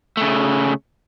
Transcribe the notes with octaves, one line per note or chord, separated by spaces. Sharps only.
C#3 A3